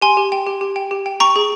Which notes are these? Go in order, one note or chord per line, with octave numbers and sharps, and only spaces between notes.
G4 G#5 C6
G4
G5
G4
G4
G5
G4
G5
G5 A#5 C#6
G#4